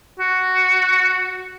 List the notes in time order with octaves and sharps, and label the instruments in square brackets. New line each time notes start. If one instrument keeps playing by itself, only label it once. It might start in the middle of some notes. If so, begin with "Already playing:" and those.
[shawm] F#4